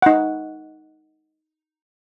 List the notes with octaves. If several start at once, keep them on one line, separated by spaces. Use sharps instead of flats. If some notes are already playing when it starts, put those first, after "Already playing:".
D#4 F#5